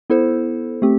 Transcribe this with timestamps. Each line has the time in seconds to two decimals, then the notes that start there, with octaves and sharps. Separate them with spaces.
0.10 B3 E4 A4 C5
0.82 A3 C4 G4